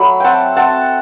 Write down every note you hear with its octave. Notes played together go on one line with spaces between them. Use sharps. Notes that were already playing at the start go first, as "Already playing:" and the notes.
Already playing: F#3 A3 B5
C4 F#5 G5 A5
C4 F#5 A5